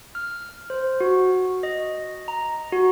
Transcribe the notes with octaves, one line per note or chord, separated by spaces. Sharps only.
F6
C5
F#4
D#5
A#5
F#4